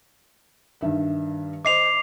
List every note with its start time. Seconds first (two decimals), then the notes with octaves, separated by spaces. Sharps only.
0.81 G2 D#3 E5
1.65 C5 D#5 D6 C7 F7